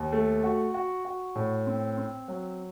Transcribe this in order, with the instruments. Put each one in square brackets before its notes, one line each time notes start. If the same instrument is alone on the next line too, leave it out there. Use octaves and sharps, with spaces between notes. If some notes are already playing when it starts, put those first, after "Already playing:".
Already playing: [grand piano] D#2
A3
F#4
F#4
F#4
A2
C4
C4
F#3